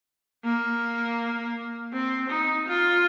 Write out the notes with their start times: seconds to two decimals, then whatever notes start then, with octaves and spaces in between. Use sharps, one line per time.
0.44 A#3
1.93 C4
2.29 D#4
2.67 F4